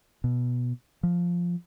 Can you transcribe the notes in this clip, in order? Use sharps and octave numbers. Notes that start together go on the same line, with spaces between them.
B2
F3